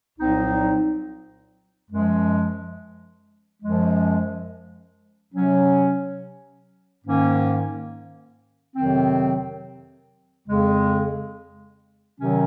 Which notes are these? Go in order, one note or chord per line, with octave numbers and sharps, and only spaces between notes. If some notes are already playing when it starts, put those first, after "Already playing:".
C2 A#2 F#3 C4 D#4
F#2 F3 G#3
F#2 F3 G#3
C3 F#3 C#4
G#2 D#3 A#3 C#4
F2 C3 D#3 F#3 C4
F2 C#3 G#3
C3 D#3 F#3 C#4